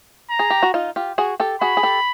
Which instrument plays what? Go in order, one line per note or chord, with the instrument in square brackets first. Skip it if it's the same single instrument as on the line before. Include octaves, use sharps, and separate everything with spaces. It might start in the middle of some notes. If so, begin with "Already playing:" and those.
[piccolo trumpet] A#5
[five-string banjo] G#4
G4
F#4
D#4 F4
F4 G4
F#4 G#4
G4 A4
[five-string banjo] F#4 G#4 [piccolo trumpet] B5
[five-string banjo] G#4
G4 A4